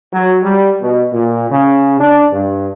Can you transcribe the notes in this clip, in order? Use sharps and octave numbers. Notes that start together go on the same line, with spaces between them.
F#3
G3
B2
A#2
C#3
D4
G2